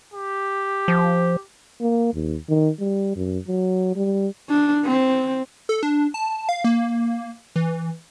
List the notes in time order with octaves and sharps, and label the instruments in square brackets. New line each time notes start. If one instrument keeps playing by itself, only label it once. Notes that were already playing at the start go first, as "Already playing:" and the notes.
[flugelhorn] G4
[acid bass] F3
[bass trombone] A#3
D#2
D#3
G3
F#2
F#3
G3
[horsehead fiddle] D4
C4
[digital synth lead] A4
D4
A5
F5
A#3
E3